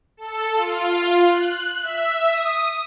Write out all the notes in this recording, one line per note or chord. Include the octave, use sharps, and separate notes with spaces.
A4
F4
F#6
E5
D#6